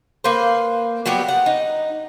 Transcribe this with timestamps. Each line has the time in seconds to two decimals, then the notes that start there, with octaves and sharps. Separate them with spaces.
0.24 A#3 B4 C5
1.06 F#3 G3 B3 G4
1.28 F#5
1.46 D#4